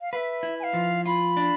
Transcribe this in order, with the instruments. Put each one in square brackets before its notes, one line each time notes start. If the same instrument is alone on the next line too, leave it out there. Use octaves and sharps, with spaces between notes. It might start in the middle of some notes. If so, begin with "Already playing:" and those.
[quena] F5
[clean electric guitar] B4 [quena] E5 F5
[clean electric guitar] E4
[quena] G#5
F5
[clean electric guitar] F3
[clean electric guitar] F4 [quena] B5
[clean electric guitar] D4